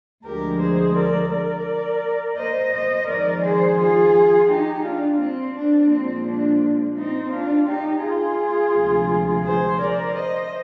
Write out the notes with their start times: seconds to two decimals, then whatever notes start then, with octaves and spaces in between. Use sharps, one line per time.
0.25 D2 D3 F3 G#3 G4 A#4
0.60 G#4 C5
0.96 A#4 D5
1.31 A#4 D5
2.37 C5 D#5
2.72 C5 D#5
3.08 F2 D#3 G#3 A#4 D5
3.43 G#4 C5
3.78 F4 G#4
4.49 D#4 G4
4.85 D4 F4
5.21 C4
5.56 D4
5.91 A#2 F3 G#3 C4
6.27 D4
6.97 C4 D#4
7.33 D4 F4
7.68 D#4 G4
8.03 F4 G#4
8.75 D2 C3 F3 G#3
9.45 G#4 C5
9.80 A#4 D5
10.15 C5 D#5